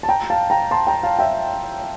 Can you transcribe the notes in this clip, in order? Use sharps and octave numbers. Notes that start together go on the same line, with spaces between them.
A5
G5 A#5
F5 A5
G5 A#5
A5 C6
G5 A#5
F5 A5
E5 G5